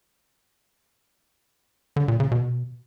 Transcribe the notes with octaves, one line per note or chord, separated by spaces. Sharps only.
D3
A#2
C#3
B2